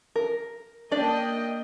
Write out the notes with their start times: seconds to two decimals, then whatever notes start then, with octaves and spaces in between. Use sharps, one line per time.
0.16 A#4
0.92 A#3 D4 D5 D#5 G5